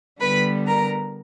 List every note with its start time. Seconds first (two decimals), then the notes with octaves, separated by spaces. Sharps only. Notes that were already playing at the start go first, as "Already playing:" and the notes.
0.20 D3 G3 B3 B4 B5
0.67 A#4 A#5